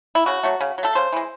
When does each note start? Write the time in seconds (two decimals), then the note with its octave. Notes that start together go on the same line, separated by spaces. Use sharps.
0.15 E4
0.26 C#3 F#4
0.43 F#3 A3
0.61 C#3
0.78 F#3
0.83 A3 A4
0.95 C#3 C5
1.13 E3 G#3